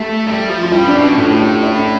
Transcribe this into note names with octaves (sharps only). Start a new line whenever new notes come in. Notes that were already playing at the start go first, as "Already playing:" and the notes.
Already playing: A3 G4
G3
F3
F4
G3 E4
D4
B2
D4
A2 F4
G4
E4
D4